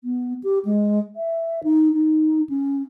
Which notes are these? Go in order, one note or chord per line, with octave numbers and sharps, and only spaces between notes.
B3
G4
G#3
E5
D#4
D#4
C#4